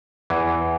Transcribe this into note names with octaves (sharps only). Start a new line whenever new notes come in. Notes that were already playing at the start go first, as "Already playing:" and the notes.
E2 E3